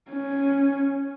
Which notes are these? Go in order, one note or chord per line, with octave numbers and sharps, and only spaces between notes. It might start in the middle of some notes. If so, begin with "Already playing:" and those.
C#4